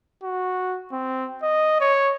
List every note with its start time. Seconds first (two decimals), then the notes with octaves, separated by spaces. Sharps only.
0.23 F#4
0.92 C4
1.43 D#5
1.81 C#5